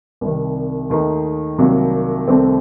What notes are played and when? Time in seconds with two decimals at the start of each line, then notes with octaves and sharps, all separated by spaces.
0.21 C2 C3 D#3
0.90 D#2 D#3 A3 D#4
1.58 C2 C3 D#3 F#3 A#3
2.28 C2 C3 D#3 A3 C4